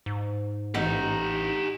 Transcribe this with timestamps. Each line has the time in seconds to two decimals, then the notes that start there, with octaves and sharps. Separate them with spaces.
0.06 G#2
0.75 A1 D#4 G4 F#5